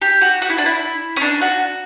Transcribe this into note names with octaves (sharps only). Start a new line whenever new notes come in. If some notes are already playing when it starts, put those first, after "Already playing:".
G4
F#4
F#4
E4
D4
E4
C#4
D4
F#4